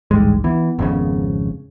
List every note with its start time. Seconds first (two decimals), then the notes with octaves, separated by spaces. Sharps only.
0.11 A1 D2 G#2 G3 G#3
0.44 E3 B3
0.79 G#1 F2 C#3